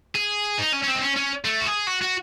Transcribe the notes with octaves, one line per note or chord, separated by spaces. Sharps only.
G#4
D#4
C#4
C#4
C4
D#4
C#4
C#4
A3
F#4
G#4
F#4
F#4